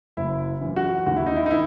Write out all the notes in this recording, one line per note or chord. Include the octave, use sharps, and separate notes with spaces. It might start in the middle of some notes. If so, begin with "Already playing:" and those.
F#1 E4
F#2 E3
F#4
D#2 F#4
E4
D#4
E4
D#4
D#3 E4